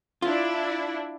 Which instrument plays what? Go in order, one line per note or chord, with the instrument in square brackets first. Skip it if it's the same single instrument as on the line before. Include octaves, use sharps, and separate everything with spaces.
[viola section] D4 E4 [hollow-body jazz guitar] F4